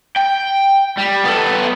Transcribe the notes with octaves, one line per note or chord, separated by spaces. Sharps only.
G5
G3
B3 A4